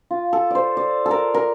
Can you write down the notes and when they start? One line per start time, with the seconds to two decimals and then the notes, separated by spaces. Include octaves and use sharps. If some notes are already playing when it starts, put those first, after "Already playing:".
0.11 F4
0.33 A4
0.50 C5 D5
0.77 D5
1.06 A4
1.11 A#4
1.34 A#4